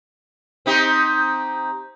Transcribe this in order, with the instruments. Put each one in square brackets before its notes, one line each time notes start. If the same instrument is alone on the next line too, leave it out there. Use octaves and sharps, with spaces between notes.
[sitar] C4 D#4 G4